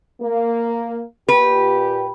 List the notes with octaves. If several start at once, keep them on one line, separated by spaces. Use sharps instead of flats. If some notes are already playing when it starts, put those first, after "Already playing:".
A#3
A#2 G4 B4